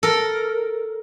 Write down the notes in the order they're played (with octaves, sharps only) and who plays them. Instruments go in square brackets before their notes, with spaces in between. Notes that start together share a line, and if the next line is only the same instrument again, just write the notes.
[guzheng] A4 A#4